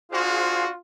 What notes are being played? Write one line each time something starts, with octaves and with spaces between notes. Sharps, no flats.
D4 F4 F#4 G#4 C5 F5 C6